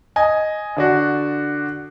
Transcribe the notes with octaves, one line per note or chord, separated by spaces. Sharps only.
D#5 G#5
D3 D4 F#4